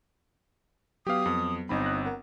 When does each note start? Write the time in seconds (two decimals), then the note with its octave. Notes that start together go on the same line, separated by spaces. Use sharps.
1.07 F#3 B3 G4 F5 D#6
1.26 F2
1.69 G1 C4 D#4 B5
1.84 F#6 A#6
2.05 A#4 F#5